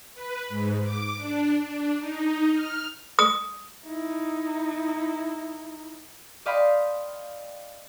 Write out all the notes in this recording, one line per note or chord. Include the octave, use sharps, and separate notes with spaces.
B4
G#2
D6
D4
D4
D#4
F6
D#6
D#4 E4
D5 D#5 F5 G5 B5 C6